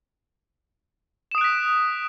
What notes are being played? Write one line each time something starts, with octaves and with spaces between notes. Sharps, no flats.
D#6 F#6 B6 D7 E7